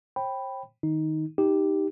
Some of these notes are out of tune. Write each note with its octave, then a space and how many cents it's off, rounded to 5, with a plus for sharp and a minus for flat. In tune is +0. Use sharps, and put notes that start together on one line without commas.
C5 +45 G5 +0 B5 +0
D#3 +0 D#4 +10
D#4 +10 G4 +0